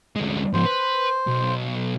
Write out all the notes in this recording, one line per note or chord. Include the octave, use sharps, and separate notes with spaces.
D2 G#3
G#2 F3 C5
B4
B1